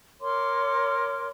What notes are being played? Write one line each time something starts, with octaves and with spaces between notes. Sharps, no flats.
A#4 C#5 C6 D6